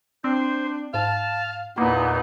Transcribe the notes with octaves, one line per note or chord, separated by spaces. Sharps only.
C4 D4 C5
G#2 F5 A5
E2 A#2 A#3 B3 D#4 E4